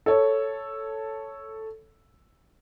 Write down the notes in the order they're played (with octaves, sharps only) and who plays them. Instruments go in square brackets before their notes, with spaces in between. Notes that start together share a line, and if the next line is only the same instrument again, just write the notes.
[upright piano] A4 C#5